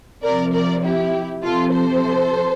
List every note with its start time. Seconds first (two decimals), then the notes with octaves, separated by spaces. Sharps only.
0.23 C3 F3 A#4 D5
0.53 A#4 D5
0.83 E4 G4
1.44 C3 F3 F4 A4
1.73 A4 C5